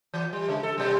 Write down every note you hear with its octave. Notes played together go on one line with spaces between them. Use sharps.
E3
G3
C#3 G#3
A4
B2 G3